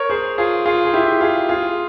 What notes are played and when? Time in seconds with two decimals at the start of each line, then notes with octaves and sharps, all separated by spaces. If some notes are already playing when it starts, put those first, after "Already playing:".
Already playing: A#4 C#5
0.09 G#4 C5
0.38 F4 G#4
0.66 F4 G#4
0.85 G#4
0.93 E4 G4
1.21 F4 G#4
1.49 F4 G#4